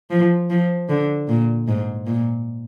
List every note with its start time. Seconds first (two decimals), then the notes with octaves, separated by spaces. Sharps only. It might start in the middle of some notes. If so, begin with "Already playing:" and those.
0.10 F3
0.50 F3
0.89 D3
1.28 A#2
1.68 G#2
2.07 A#2